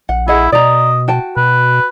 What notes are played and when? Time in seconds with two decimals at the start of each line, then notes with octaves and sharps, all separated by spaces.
0.09 A#1 F#5
0.28 E4 G#4 D#5 F#5
0.52 B2 D5 D#5 A#5
1.08 F#4 G5 A5
1.37 B2 B4